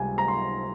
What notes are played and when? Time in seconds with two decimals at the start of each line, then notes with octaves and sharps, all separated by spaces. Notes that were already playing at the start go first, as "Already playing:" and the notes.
Already playing: C#2 C3 G3 G#5
0.18 A#5
0.28 C6